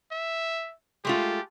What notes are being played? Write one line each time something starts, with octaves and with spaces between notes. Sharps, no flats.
E5
G#3 A3 F4 G4